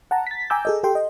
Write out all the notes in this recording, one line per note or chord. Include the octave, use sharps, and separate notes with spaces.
F#5 A5 A#5
A6 B6
G5 G#5 A#5 D6 E6 G6
G#4 A4 D#5
G4 A4 G5 C6
D#5